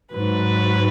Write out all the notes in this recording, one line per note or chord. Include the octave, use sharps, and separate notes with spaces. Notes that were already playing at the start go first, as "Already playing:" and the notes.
G#2 F#3 B4